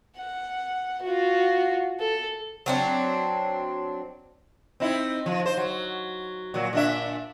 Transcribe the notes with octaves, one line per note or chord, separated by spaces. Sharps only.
F#5
F4 F#4
A4
F#3 C4 D4
C4 D#4 E4
F3
C5
F#3
A#2 F#3
A#2 D4 E5